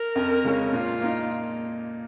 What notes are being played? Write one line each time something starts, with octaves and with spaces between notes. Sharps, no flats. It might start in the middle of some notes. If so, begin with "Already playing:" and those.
Already playing: A#4
F2
C#3 G#3 C#4
A#2 F4
A#3 D#4